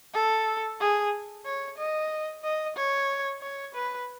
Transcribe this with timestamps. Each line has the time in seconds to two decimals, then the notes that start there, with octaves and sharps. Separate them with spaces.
0.14 A4
0.80 G#4
1.45 C#5
1.77 D#5
2.44 D#5
2.77 C#5
3.41 C#5
3.74 B4